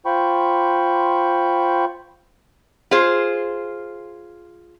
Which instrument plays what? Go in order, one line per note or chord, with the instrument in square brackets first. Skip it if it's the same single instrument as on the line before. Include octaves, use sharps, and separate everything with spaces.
[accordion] F4 C5 G5 B5 C#6
[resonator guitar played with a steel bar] F4 G#4 C5